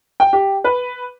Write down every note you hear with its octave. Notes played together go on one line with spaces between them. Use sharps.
G5
G4
B4